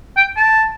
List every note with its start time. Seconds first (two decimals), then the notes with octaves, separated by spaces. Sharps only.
0.17 G5
0.36 A5